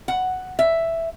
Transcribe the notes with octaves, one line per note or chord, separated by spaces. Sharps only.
F#5
E5